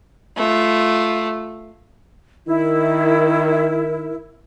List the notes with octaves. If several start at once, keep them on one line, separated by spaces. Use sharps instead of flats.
A3 F4
D#3 E4 A#4